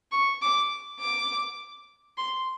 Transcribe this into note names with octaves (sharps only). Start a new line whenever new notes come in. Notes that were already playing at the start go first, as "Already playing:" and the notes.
C#6
D6
D6
C6